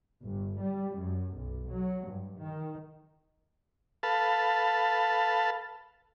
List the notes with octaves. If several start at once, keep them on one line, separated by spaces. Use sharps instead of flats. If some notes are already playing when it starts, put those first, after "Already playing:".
G1
G3
F#2
B1
F#3
G2
D#3
A4 B4 F5 A5